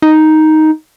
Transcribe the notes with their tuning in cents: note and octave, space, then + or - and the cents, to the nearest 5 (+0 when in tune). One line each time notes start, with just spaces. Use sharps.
D#4 +5